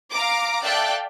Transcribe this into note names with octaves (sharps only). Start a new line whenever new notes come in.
F5 A#5 D6
A4 D5 E5 F5 G5 F#6